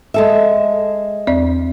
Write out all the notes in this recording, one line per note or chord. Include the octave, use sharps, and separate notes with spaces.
G#3 A4 E5
E2 C4 D5